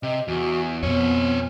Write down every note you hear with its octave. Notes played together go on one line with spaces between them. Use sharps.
C3 D#5
E2 F#4
F2 B2 B3 C4 C#5